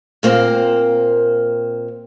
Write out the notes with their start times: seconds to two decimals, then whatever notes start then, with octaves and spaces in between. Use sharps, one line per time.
0.23 A#2 A#3 C4 C5